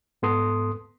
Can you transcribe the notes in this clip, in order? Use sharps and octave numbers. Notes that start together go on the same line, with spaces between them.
G#2 B3 A4 C6 D#6